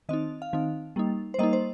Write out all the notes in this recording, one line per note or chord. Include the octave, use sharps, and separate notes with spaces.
D#3 C4 D#4 D#5
F5
D#3 C4 D#4
G3 A#3 D#4
C5
G3 A#3 D#4 D#5
C5